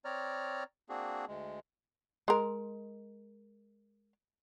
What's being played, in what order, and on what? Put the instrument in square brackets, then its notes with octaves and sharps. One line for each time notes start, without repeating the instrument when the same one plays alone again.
[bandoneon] C4 C#5 D5 A#5 F6
A#3 C4 D4 F#4 G#4
D2 G#3
[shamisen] G#3 A#4